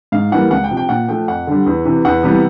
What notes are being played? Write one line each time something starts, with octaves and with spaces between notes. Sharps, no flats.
G#2 F5
E3 G3 A#3 F#5
C#2 F#5
G5
C3 F3
G5
A#2 F#5
F3 A3 G5
F2 F#5
D3 G3
E2
C3 E3
E2 F#5
C3 E3 G3 B3